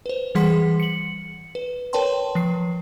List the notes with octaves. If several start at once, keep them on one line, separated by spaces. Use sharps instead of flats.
B4 C5
E3 G3 G#4 F#5 C6 B6
C#7 F#7
B4
A#4 B4 C#5 G5 A5 C6
F3 C7